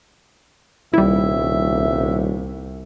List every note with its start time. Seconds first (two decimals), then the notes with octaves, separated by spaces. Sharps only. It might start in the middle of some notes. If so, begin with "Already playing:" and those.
0.94 D#1 C2 G3 E4 E5